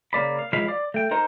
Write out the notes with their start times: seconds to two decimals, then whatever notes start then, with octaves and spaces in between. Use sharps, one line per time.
0.13 C#3 A#3 D5 B5
0.39 F5
0.53 D#2 E3 F3 G#3 F5 B5
0.68 D5
0.94 A3 G5
1.11 D#4 A#4 C5